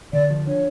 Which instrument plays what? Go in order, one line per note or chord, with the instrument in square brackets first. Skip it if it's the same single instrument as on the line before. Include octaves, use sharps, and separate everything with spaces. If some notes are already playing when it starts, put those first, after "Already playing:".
[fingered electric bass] D3 [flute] D5
[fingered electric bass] F3
[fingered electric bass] D4 [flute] C#5